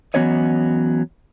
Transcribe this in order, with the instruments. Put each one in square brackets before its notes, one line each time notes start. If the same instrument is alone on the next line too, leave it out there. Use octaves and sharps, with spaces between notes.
[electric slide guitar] E3 F#3 B3 C#4 C#5 D#5